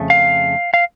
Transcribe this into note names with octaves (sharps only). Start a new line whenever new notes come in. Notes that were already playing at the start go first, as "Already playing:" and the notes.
Already playing: F2 C#3 A3
F5
F5